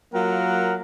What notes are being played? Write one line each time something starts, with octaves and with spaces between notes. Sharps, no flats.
F#3 A#3 F4 A#4 F#5